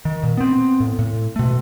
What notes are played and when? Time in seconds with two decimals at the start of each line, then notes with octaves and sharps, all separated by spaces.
0.05 D#3
0.23 A#2
0.37 B3 C4
0.80 A2
0.99 A2
1.36 B2 A3